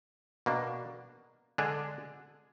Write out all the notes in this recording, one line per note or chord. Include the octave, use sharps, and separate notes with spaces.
B2 A#3 D4
D3 G#3 D4 G#4